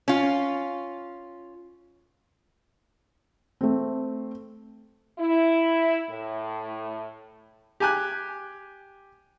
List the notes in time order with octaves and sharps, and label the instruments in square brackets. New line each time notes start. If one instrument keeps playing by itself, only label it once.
[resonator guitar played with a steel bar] C#4 F4
[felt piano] A3 C4
[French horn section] E4
A2
[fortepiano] G4 G#5 F#6